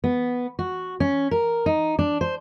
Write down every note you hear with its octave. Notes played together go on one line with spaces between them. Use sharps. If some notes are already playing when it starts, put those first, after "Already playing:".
B3
F#4
C#4
A#4
D#4
D4
C5